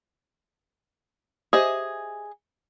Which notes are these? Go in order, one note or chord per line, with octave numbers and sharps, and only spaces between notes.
G4 G#4 C5 D#5 E5